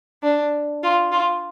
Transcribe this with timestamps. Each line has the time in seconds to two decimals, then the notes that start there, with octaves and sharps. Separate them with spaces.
0.23 D4
0.83 F4
1.12 F4